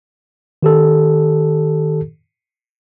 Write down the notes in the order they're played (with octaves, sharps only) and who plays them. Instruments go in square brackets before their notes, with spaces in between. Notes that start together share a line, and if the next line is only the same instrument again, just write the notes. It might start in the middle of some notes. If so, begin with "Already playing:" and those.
[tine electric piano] D#3 G4 A4